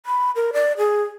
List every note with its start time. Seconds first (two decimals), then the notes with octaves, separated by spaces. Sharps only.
0.06 B5
0.36 A#4
0.53 D5
0.78 G#4